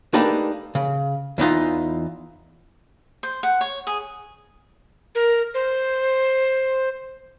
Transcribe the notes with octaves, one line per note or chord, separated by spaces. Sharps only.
A3 A#3 D4 D#4 G4 B4
C#3
E2 E3 D#4 F4
C5
F#5
C#5
G#4
A#4
C5